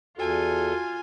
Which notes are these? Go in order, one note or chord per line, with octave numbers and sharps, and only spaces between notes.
E2 F4 F#4 A4 G#5